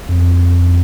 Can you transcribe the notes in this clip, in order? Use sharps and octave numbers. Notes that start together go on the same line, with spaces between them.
F2